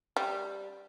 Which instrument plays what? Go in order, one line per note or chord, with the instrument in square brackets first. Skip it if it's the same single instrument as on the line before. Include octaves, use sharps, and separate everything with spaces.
[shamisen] G3